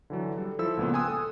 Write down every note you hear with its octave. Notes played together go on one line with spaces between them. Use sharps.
D3 E3 F#3
G3 A4
F3 E4 A4 E6
C#2 A#2 B3
G5 G#5 C6 D#6 E6 F#6
A4